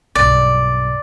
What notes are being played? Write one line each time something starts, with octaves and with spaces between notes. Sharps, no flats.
B1 G2 D5